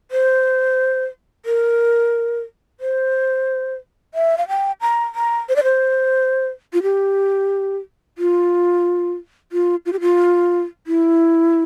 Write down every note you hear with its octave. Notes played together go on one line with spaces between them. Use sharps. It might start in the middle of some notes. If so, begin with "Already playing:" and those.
C5
A#4
C5
E5
F5
G5
A#5
A#5
C5
D5
C5
F4
G4
F4
F4
F4
G4
F4
E4